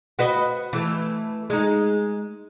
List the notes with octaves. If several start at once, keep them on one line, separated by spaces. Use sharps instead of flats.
F#4 B4 D#5
E3 A3
G#3 D#4